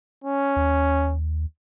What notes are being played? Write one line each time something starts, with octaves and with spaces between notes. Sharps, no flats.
C#4
D#2